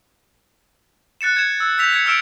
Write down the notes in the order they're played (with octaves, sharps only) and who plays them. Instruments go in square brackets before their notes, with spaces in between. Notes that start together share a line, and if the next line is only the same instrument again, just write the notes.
[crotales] F#6 A6 C#7 E7
G#6 E7
E6
E6 G6 B6 F7
G#6 C#7
E6 F6 D7 E7